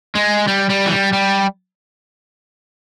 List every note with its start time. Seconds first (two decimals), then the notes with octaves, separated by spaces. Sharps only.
0.15 G#3
0.48 G3
0.70 G3
0.86 E3
0.91 G3
1.13 G3